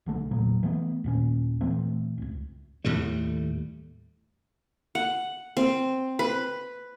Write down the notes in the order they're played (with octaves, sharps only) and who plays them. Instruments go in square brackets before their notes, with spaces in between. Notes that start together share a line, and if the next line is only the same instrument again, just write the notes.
[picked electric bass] B1 D3 A3
E2 A#2 C#3 F#3
E3 A3 B3
D#2 A#2 C#4
A#2 E3 A3 C4
D1 C#2
[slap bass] D#2 A2 G3 A3
[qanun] F#5
C4
B4